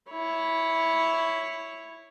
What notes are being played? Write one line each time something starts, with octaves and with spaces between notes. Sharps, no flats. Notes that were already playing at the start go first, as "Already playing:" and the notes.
E4 C#5